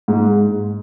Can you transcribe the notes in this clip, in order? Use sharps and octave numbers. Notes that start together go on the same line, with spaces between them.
G#2